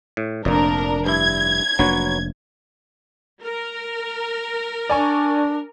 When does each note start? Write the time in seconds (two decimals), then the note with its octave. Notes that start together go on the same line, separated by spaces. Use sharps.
0.17 A2
0.45 F1 F2 A#2 D4 A#4
1.06 G2 E4 G#6
1.79 F1 F#3 A#3 D4 B4 C#5
3.42 A#4
4.90 D4 D5 G#5 C#6